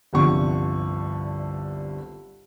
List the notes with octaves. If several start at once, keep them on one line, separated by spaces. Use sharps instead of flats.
G1 C2 G2 D3 F3 C#6